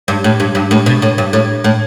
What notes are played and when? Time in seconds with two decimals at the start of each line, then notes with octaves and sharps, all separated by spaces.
0.08 G2
0.24 A2
0.40 G2
0.55 G2
0.71 A2
0.86 B2
1.02 A2
1.18 G2
1.33 A2
1.64 A2